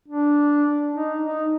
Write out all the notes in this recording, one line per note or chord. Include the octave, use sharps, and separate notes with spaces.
D4
D#4
D#4